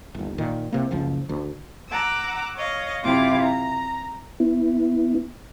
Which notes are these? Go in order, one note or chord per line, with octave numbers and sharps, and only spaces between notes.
G1 D#2
A#2 D#3
C2 C3 A#3
F#1 C#2 F3
D2
F#5 A#5 D6 E6
C#5 D#5 F5
F#2 C3 E4 F4 F5 D6
A#5
B3 E4